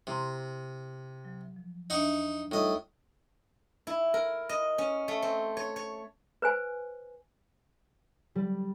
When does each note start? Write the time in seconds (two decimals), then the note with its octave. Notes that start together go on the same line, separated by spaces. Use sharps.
0.07 C3 E4 A#5 C6
1.25 F#3
1.56 F3
1.90 E2 D4 D#4 E5 F#5 C#6
2.52 A2 G3 D#4 F4 D#5
3.87 E4
4.14 A#4
4.49 D#5
4.78 C#4
5.08 A3
5.23 C4
5.57 C#5
5.76 C#5
6.42 B4 C5 G#5
8.35 G3